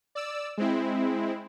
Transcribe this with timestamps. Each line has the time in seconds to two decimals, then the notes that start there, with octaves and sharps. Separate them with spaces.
0.15 D5 E6
0.58 G#3 C4 E4